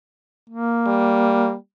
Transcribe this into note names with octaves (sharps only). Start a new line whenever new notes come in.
A#3
G3